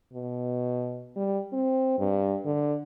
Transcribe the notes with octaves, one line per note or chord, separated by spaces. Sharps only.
B2
G3
C4
G2
D3